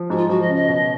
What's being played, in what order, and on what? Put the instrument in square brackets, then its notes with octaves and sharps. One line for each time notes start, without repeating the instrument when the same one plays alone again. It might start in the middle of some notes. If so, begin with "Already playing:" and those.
Already playing: [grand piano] F3
[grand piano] G#2 [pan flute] F#4
[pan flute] F4
[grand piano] F3 [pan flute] F#4
[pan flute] D#5
[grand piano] C#3
[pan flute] D#5
[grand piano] B2